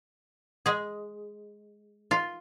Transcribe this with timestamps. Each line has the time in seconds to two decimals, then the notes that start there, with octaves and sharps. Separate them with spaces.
0.66 G#3 G#4
2.11 F4